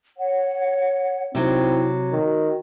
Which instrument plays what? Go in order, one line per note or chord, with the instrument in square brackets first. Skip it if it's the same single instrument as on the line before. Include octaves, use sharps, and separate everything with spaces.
[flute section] C#5 F#5
[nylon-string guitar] C3 F#3 [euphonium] C4 [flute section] D#4 E4
[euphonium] D#3 [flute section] F#4